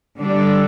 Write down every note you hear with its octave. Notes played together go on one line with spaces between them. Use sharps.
D3 G3 D4 A4